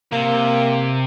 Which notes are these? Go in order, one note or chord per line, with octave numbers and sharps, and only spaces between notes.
C3 A#3